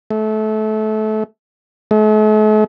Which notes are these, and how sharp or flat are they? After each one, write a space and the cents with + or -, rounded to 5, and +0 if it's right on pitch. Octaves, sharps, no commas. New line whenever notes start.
A3 -25
A3 -45